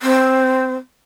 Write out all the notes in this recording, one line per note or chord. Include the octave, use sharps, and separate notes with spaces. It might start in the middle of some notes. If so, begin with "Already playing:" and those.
C4